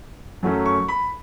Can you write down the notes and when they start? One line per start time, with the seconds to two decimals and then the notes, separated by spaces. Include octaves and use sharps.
0.43 F#2 F#3 A3 C#4
0.65 C#6
0.88 B5